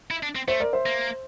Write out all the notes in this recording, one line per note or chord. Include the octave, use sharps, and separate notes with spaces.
E4
D4
C4
A3 C5 E5
A#4 D5
C5 E5
A#3